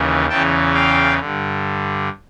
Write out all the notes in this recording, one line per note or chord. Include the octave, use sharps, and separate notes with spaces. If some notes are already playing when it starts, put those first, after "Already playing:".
Already playing: D#2 C#3 E3
E2 C#3 E3 G5 A5
F5 G5
G2 D3